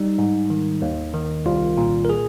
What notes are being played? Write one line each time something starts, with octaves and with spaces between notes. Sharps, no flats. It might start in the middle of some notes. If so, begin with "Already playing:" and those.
Already playing: G3 D#4
G#2
D#3
D#2
D#3
C2 F4
A#2
A#4
G#4